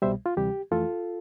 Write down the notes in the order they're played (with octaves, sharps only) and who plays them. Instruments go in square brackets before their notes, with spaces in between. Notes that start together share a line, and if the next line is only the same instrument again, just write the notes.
[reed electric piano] C2 B2 G3 C5 E5
F4
D2 C3 E3 G3 G4
F2 E3 A3 F4 A4